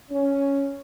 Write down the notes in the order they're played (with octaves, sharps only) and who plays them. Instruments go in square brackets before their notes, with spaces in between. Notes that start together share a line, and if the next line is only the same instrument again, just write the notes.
[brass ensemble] C#4